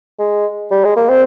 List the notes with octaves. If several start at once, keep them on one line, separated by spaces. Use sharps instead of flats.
G#3
G3
G#3
A#3
C4